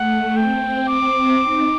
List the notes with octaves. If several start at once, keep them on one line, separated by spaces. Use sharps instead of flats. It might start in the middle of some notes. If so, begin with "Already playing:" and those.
Already playing: A3 F#5
C4 G5
D6
D#4